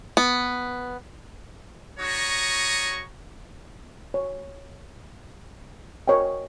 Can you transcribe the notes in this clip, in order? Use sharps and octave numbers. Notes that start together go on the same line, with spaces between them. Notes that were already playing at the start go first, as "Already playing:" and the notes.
B3
D4 F#4 C#5 A#5 C#6 D#6
C#5
A#4 C#5 D#5 G5